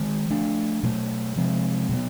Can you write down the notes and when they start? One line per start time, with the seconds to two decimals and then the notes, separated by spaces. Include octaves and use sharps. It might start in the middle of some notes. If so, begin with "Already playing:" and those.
Already playing: D#3 G#3 C4
0.30 F3 A3 D4
0.83 B2 F#3 A3
1.36 C3 F3 G#3 C4
1.89 B2 F#3 B3